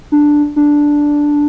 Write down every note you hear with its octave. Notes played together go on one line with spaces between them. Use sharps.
D4
D4